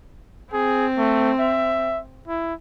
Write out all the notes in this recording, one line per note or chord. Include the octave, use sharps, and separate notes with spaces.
C4 G#4
A3
E5
E4